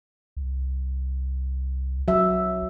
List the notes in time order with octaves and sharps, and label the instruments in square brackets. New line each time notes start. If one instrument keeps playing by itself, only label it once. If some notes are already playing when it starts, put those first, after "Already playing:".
[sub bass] C2
[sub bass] B1 [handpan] F#3 E5